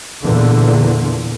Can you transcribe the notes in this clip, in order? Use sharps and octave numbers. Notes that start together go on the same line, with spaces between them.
E2 A#2 D3